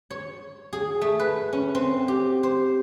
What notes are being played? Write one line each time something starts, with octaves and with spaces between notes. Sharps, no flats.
C#5
G#4
A3
B4
C#4
C4
G4
C5